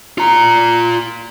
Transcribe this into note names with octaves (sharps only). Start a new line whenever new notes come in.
F4 A#5